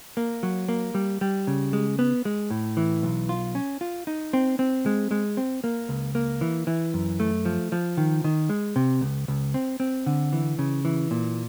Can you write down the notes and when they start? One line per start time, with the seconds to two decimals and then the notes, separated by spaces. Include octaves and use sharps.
0.17 A#3
0.43 F#3
0.69 A#3
0.95 G3
1.21 G3
1.47 C#3
1.73 G#3
1.99 B3
2.25 G#3
2.50 A2
2.77 E3
3.03 B1
3.29 F4
3.55 C#4
3.81 F4
4.07 D#4
4.33 C4
4.59 C4
4.86 G#3
5.11 G#3
5.37 C4
5.64 A#3
5.89 C#2
6.15 A#3
6.41 E3
6.67 E3
6.94 F#2
7.20 A3
7.45 F3
7.72 F3
7.97 D#3
8.24 D#3
8.49 G#3
8.76 C3
9.01 C#2
9.28 C#2
9.54 C4
9.80 C4
10.06 D3
10.33 E3
10.59 C#3
10.85 E3
11.11 A#2